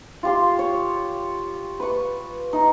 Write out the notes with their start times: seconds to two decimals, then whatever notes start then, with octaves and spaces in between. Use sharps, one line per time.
0.23 F4 G4 C6
0.59 C#5
1.80 B4 C#6
2.53 D#4